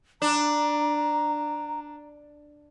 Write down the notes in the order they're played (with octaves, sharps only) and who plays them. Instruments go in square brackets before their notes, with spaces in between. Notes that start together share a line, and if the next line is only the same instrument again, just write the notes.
[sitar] D4 [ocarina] A#5